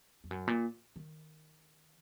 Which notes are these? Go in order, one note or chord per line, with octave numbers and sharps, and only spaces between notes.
F2
F#2
A#2
D#3